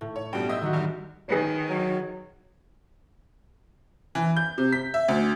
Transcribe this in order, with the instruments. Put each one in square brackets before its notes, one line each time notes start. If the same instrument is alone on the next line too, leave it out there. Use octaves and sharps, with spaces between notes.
[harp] A2
[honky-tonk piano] C#5
[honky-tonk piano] G2 B2 G3 [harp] G5
[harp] C5 [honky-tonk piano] D#5 E5 D#6
[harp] D#3 F#3 F#4
[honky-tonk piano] E2 G2
[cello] D#3 [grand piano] G#4 B4 C#5
[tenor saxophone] F#3
[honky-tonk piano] E3
G6
C3
B6
E5
D2